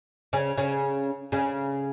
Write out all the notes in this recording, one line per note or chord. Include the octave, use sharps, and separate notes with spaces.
C#3 C#4
C#3 C#4
C#3 C#4